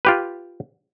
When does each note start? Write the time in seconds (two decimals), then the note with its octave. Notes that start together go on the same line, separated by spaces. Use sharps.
0.05 F4 G4 B4